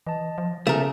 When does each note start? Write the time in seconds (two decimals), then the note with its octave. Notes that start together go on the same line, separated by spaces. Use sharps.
0.07 E3 D#5 A5
0.38 F3
0.67 C#3 A3 C#4 G#4 A#4